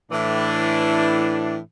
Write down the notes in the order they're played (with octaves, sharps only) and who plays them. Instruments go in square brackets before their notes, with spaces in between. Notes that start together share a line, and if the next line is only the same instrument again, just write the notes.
[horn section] A2 E3 D4